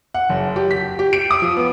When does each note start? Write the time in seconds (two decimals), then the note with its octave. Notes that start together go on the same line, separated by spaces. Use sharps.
0.14 F#5
0.29 F#1
0.56 G4
0.71 B6
0.99 G4
1.13 D7
1.31 D#6
1.42 F3
1.57 B3